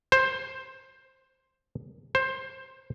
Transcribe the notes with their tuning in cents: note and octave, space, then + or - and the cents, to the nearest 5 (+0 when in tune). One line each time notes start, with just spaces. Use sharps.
C5 +10
C5 +15